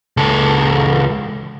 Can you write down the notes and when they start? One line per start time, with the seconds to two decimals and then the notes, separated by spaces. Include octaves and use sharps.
0.17 C#2 A4